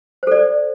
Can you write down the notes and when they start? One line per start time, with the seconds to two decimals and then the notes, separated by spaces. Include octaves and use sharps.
0.23 C5
0.27 A4
0.32 D5